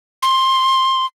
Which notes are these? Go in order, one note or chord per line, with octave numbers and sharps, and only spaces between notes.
C6